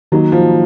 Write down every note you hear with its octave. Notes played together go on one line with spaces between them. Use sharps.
D#3 F#3 A#3 D#4
F3